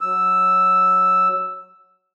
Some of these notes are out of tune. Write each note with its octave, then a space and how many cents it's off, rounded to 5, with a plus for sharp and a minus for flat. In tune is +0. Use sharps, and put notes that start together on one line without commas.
F#3 +0 E6 +0